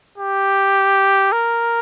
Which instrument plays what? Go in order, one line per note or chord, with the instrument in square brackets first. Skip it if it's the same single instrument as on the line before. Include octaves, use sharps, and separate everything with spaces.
[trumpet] G4
A#4